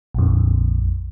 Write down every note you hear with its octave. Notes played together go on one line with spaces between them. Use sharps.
A#1 F2